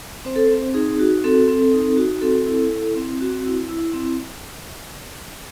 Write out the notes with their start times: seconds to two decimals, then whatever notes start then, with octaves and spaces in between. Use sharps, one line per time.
0.25 C4 C5
0.36 A4
0.47 C4 C5
0.74 D#4 G#4
0.99 F#4
1.24 C4 A4
1.48 C4
1.73 D#4
1.97 F#4
2.21 C4 A4
2.46 E4
2.71 E4
2.95 C4
3.20 C4 F#4
3.45 E4
3.69 E4
3.93 C4